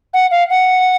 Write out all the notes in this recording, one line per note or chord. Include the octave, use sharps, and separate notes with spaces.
F#5
F5
F#5